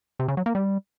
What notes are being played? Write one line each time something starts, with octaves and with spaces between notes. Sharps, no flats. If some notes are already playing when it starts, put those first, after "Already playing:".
C3
C#3
F#3
A#3
G3